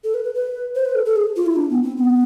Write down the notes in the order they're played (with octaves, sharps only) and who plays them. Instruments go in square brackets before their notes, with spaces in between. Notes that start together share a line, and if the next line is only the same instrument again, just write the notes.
[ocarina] A4
B4
B4
B4
C5
B4
A4
A4
G#4
F4
E4
D4
B3
C4
B3